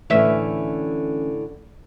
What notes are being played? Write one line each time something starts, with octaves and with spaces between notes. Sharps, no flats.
A2 D3 E3 C#4 E5